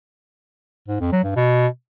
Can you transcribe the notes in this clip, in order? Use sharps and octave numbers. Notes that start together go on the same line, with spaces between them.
G#2
F2
F#3
G2
B2